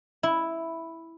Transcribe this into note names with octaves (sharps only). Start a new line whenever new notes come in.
E4